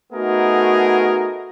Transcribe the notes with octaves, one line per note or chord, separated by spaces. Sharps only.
A3 B3 D#4 F#4 G#4 A#4